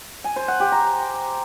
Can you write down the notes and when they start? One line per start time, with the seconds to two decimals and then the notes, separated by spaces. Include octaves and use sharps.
0.24 G#5
0.36 C5
0.48 F#5
0.60 G4
0.72 A#5